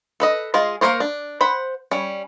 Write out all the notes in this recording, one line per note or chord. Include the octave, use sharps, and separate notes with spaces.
A4 B4 D#5
G#3 F4 G#4 D#5
A#3 B3 A#4 C5 C#5
D4
C5 F#5 B5
G3 C#4